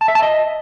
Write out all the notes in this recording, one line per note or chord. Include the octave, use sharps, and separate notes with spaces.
A5
E5
A5
D#5